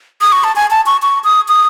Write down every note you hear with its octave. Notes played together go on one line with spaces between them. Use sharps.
D#6
C#6
A5
G#5
A5
C#6
C#6
D#6
D#6